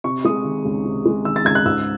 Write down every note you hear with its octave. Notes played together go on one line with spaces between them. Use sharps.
C3 C#6
G#3 D#6
D#3
C#2
C3
G#3
D#3 E6
A6
C#2 G#6
F#6
G#2 E6